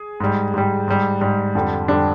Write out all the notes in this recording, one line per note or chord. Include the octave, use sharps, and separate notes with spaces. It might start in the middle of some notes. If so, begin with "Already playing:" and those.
Already playing: G#4
G#2 G3
G#2 G3 G4
G#2 G3
G#2 G3
F2 D3 G3
F2 D3 G3 D4